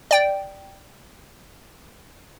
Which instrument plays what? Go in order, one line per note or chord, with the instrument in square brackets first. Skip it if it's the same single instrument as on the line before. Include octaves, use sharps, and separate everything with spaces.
[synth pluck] D5 G5